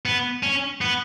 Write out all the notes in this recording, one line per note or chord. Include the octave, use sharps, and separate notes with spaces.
B3
C#4
B3